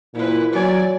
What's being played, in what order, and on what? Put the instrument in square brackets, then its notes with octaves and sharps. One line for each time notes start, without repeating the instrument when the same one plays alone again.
[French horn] A#2 [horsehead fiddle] E4 B4
[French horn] F#3 [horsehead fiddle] D5 G#5